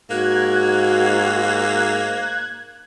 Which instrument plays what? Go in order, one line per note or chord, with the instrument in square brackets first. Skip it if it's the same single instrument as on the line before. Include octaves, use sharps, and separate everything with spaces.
[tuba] G#2 [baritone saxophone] A#3 [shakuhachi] F#4 [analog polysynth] F#6 G#6